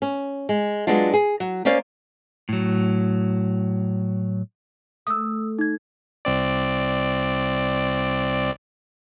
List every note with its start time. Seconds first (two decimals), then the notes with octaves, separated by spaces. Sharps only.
0.02 C#4
0.49 G#3
0.87 F#3 G#3 B3 D4 F4
1.14 G#4
1.40 F#3
1.65 A#3 C#4 C5 D5 F5
2.49 A2 F#3
5.07 A3 D#6 E6
5.59 D#4 G#6
6.25 C2 C4 D5